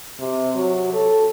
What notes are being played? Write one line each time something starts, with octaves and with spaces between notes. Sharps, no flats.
C3
F#3
A4